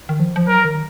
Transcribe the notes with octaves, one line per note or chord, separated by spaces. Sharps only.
D#3
F3
F3
F#3 A#4
D#3